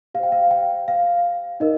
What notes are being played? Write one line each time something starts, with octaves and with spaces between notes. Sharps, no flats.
G4 C5 F5 G5
F5
G5
F5
D#4 A#4 D#5